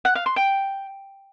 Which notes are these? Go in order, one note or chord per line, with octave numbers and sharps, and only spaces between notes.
F#5
F5
C6
G5